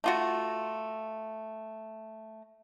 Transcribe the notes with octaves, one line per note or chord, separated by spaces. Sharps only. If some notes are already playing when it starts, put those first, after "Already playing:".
A3 F4 F#4